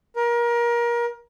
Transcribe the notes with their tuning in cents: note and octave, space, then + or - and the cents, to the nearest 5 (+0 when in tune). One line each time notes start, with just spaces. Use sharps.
A#4 +25